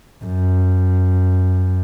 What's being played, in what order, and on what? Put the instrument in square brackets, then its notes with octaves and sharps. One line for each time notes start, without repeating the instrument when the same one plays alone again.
[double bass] F#2